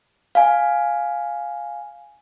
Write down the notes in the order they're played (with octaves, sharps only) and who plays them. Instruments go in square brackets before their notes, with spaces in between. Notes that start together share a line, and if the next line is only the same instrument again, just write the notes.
[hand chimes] F5 G#5